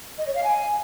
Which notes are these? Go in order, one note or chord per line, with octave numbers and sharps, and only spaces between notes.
D#5
C#5
F5
G#5